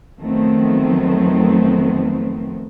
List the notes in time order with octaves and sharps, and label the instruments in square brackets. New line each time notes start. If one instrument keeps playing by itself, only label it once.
[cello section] F2 D#3 F#3 A3 B3 C4